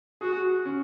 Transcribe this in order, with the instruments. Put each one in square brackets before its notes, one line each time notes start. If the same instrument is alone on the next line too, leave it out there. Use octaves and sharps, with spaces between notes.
[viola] F#4 [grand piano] G#4
[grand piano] C#4